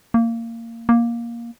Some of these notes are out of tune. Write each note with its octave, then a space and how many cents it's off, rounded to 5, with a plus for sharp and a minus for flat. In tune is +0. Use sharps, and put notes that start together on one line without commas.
A#3 -20
A#3 +10